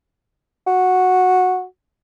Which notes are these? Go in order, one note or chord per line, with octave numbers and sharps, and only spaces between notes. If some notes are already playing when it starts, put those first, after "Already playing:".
F#4